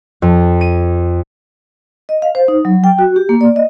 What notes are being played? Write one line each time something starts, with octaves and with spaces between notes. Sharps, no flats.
F2
D#7
D#5
F5
C5
D#4
F#3
G5
F#4
G4
A#3
D5
D#5